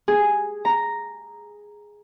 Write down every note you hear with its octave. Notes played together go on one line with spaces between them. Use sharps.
G#4
A#5